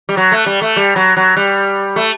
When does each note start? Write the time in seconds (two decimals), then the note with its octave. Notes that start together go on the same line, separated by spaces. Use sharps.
0.09 G3
0.17 F#3
0.32 A3
0.46 G3
0.62 A3
0.76 G3
0.96 F#3
1.17 F#3
1.37 G3
1.96 A3